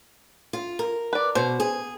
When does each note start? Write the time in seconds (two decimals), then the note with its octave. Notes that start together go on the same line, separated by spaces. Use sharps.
0.53 F4
0.79 A#4
1.13 B4 D5
1.35 B2 C5
1.60 G#4